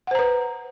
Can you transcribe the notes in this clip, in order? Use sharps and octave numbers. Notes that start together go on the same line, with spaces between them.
B4 C5 F#5 A#5